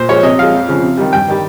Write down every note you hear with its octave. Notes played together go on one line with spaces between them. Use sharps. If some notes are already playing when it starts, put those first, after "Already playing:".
Already playing: A#2 C5
F3 G#3 C#5
C3 D#5
F3 G#3 F5
F2
C#3 F3
C3
D#3 G3
G2 G5
D#3 G3